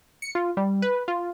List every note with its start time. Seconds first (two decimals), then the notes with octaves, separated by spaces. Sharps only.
0.22 C#7
0.35 F4
0.57 G3
0.82 B4
1.08 F4